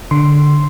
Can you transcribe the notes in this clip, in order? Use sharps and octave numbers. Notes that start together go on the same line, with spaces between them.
D3 C6